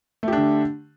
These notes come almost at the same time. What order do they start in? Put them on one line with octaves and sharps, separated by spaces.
A3 G4 D4 D3